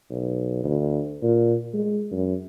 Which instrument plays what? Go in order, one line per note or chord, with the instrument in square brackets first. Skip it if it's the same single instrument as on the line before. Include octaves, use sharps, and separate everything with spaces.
[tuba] B1
D2
A#2
G#3
F#2